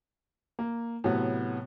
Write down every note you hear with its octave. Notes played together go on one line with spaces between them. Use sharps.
A#3
A2 C3 F#3 B3